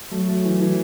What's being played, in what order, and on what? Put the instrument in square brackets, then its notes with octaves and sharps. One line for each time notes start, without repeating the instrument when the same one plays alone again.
[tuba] F#3 [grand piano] A3
[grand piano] A3
E3
E3